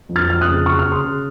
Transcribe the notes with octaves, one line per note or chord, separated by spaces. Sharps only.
F2
F6 A6
F2 F6
D#6 F#6
C#3
C#3 C#6 F6
F6
C#3
C6 D#6
C#3